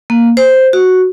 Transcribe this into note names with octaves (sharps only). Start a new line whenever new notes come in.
A#3
C5
F#4